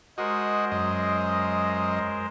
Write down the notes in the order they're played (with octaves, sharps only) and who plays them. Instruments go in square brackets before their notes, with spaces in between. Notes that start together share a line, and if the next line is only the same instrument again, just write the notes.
[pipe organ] G#3 A#4 C5 [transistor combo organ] F#4 D#5
[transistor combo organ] F#2 D#5